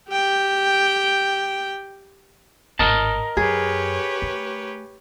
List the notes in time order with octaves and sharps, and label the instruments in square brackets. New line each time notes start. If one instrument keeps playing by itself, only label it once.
[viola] G4 G5
[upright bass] G#1 A2 [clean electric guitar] A#4 D#5 A5
[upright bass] F#2 [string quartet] G4 B4 C#5 [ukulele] G#4
[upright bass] A3